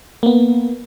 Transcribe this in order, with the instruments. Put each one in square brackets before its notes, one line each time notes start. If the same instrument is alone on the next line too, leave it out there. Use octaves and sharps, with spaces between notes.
[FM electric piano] A#3 B3